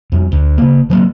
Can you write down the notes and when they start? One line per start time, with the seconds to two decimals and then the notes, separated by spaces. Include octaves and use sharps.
0.12 F2 G3
0.32 D2
0.58 C#3 A#3
0.90 D#3 F#3 G#3 A#3